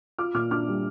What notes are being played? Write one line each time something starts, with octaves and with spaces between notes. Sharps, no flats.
F4 D6 F6
A#2 D6 F6
D4 D6 F6
G3